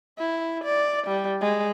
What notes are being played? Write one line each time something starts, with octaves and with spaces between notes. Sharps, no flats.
E4
D5
G3
G#3